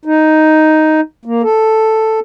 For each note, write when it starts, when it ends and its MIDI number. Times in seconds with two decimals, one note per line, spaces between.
0.05 1.01 63
1.25 1.42 58
1.43 2.20 69